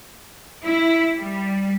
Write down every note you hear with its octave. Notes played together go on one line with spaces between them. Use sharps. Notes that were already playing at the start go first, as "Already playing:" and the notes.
E4
G3